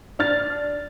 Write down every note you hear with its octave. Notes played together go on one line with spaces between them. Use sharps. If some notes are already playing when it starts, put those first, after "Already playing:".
D4 F6 A6